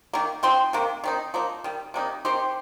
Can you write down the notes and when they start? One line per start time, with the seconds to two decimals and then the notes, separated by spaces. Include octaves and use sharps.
0.13 D#3 A#3
0.43 F3 C4 D#4 G5 C6
0.73 C3 D#3 A#3
1.04 D#3 C4 D#4
1.34 F3 A#3 D#4
1.64 D#3 G3
1.94 C3 G3 A#3 D#4
2.25 D#3 C4 D#4 G4 C5